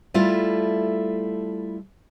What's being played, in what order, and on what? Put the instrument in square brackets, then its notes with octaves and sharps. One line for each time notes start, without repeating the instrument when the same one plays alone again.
[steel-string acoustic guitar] G3 A3 E4 F4 A4